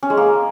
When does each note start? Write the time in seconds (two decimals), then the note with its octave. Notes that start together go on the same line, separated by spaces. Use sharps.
0.03 C#4
0.10 G#3
0.17 A#3